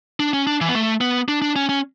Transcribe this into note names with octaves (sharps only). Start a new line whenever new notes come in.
D4
C#4
D4
E3
B3
A3
B3
D4
D4
C#4
C#4